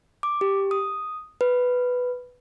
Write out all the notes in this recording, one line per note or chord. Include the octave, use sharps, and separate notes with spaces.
D6
G4
D#6
B4